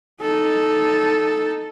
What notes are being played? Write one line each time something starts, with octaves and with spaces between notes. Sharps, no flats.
D#4 A4